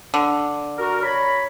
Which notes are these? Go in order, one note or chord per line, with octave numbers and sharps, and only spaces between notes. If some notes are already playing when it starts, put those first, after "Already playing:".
D3
F#4 A#4
C#5 A#5 B5